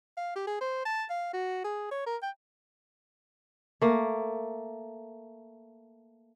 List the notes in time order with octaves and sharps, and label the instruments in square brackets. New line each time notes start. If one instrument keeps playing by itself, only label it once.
[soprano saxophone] F5
G4
G#4
C5
A5
F5
F#4
G#4
C#5
A#4
G5
[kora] A3 A#3